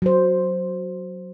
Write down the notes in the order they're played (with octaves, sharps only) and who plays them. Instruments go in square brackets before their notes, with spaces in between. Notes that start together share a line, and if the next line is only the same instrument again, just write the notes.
[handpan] F#3 C5